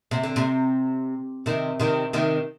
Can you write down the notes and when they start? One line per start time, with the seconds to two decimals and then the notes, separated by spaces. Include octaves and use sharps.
0.11 C3
0.23 D3
0.36 C3
1.46 C3 D#3
1.80 C3 D#3
2.13 C3 D#3